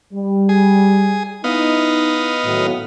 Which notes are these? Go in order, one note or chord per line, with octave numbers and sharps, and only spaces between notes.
G3
G#4
B3 D#4 E4 D#5 F5
A2 D#3 F#3